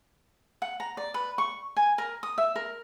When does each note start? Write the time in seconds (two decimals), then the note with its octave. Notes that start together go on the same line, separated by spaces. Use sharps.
0.62 F#5
0.80 A#5
0.97 D5
1.14 B4
1.38 C#6
1.77 G#5
1.98 A#4
2.23 D#6
2.38 E5
2.56 A#4